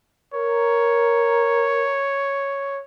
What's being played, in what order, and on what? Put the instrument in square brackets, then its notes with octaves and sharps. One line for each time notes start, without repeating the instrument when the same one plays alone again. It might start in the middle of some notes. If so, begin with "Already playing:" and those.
[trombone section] A#4 [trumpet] C#5